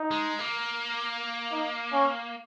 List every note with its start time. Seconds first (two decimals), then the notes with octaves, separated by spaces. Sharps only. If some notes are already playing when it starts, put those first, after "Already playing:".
Already playing: D#4
0.11 G#3
0.39 A#3
1.51 D#4
1.93 C#4